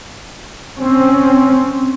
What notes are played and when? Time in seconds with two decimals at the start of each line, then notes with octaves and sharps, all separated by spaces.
0.79 C4 C#4